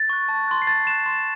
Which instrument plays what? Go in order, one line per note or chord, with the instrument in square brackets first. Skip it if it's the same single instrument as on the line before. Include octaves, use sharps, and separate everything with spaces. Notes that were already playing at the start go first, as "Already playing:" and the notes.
Already playing: [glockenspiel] A6
C#6 F#6
A5
C6 F#6
C7
A5 A6
C6 F#6 E7
C6